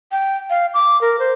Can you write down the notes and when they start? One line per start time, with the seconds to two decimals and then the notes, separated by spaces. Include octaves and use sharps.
0.12 G5
0.50 F5
0.74 D6
1.01 A#4
1.19 C5